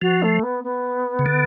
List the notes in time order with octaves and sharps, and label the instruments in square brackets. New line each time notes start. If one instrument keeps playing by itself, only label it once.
[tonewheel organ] F3 [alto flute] F#4
[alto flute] A3
B3
B3
[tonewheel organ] C#3
D3